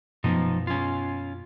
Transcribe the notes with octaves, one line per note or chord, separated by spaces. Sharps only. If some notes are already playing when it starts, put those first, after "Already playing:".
F#2 B2 F3 B3 D#4
C#4 F4